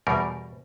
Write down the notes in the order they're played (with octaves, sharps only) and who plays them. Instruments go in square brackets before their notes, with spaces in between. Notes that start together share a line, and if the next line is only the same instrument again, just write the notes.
[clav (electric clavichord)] E2 B2 G3 A#4